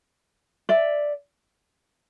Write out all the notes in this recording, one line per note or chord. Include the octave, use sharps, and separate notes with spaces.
D5 E5